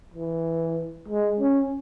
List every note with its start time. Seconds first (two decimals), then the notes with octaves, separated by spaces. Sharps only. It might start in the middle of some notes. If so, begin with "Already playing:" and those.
0.14 E3
1.08 G#3
1.40 C#4